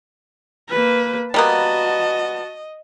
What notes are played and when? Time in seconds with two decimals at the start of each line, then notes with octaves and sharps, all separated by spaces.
0.70 A#3 B4
1.34 G3 A#3 B3 F#4 D#5 A5